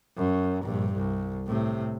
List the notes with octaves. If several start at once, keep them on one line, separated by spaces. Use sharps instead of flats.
F#2
A#1 G2
C2
A2 C3